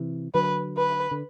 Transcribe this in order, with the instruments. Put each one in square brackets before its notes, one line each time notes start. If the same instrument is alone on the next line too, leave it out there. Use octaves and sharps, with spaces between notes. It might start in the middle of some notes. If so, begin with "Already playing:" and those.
Already playing: [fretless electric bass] C3 E3
[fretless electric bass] D3 F#3 [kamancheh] B4
[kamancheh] B4
[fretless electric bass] D3